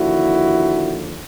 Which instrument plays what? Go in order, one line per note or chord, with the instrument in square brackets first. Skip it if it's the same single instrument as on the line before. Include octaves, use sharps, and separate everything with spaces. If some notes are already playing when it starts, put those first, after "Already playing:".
Already playing: [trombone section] D#2 D3 F3 E4 F#4